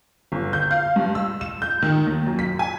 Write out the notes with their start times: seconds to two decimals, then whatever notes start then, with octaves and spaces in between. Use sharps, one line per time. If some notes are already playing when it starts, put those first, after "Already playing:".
0.32 G1
0.53 G6
0.71 F5
0.96 G2
1.15 E6
1.41 E7
1.62 G6
1.82 D#3
2.07 D#2
2.27 F#2
2.39 B6
2.59 G#5